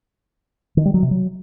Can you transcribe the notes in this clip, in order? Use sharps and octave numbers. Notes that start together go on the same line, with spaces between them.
D#3
G3
F#3
C3
F#3